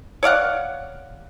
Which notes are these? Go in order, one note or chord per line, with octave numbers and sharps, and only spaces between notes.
C#5 D5 F5 F#5